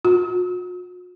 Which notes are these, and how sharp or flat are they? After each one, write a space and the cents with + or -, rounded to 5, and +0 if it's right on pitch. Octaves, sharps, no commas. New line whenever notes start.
F#4 -45